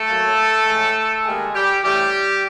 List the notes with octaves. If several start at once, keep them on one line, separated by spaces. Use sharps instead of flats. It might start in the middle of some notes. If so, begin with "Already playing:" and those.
Already playing: A3 A4
A2 F#3 A#3
A2 E3 G#3
D#3 G3 G#3 A#3 G#4
G3 G4
A2 E3 G3 A3 G4